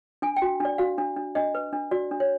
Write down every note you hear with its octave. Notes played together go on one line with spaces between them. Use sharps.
D4 G#5
G5
F#4
D4 D5
F#4 F5
D4
D4
D4 D#5
B4
D4
F#4 D5
D4
C#5